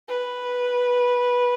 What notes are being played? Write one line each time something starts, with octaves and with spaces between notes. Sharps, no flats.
B4